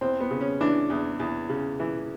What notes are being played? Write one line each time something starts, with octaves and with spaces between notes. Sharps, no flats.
E2 C4
B3
C#3
C#4
E3 D4
E2
E2
C#3
E3